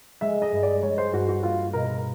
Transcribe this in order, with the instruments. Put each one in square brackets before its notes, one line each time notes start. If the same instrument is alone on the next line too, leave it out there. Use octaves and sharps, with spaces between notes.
[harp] G#3 [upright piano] E5
[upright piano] D#5
[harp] G2
[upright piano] D5
[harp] G#3 [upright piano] C#5
[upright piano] C5
[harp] G2 [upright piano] F#4
[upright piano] F#4
[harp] A#3 [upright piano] F4
[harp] B2 [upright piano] A#4